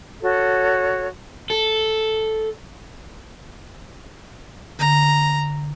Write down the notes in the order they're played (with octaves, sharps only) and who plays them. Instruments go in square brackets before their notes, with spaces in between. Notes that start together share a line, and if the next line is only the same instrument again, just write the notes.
[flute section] F#4 A4 C#5
[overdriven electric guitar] A4
[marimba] D3 [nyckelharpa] A#5